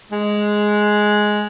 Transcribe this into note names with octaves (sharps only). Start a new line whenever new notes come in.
G#3